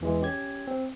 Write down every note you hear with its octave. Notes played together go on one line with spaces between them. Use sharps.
E2 E3 G#3
C#4 G4 G#6
C4